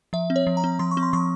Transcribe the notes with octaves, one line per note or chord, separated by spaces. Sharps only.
F3 E5
C4
C#5
F3
A#5
C4
F3 C6
C#6
C4
C6
F3 C#6